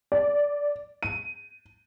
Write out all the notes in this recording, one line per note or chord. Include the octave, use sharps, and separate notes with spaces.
D5
D#7